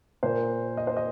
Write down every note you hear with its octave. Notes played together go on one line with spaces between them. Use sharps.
A#2 A#3 C5
D#5
C5
D#5